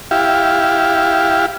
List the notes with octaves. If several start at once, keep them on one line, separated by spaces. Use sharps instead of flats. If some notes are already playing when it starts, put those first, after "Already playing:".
E4 G4 F5